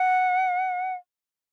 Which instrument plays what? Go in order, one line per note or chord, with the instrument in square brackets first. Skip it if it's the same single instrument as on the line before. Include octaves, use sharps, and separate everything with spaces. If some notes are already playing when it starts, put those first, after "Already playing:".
Already playing: [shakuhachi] F#5